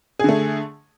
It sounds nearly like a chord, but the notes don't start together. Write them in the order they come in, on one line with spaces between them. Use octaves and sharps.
G#4 D3 A3